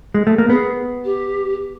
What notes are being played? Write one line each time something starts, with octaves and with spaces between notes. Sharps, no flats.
G#3
A3
A#3
B3 G#4
G4